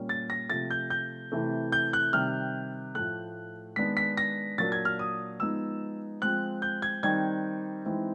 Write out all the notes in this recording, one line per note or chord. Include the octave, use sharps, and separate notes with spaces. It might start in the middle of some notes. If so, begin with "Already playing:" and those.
Already playing: A#2 G3 A#3 C#4
A6
A#6
C3 F3 A3 A6
G6
G6
C3 E3 A3
G6
F#6
C3 D#3 G3 F6
A2 F3 A3 F#6
D#3 G#3 B3 D4 B6
B6
A#6
A#2 F#3 A#3 D4 A6
G#6
F6
D#6
F3 G#3 B3 D#4 E6
F3 G#3 C4 F#6
G6
G#6
D#3 G3 C4 D#4 G#6
E3 G#3 C4 D#4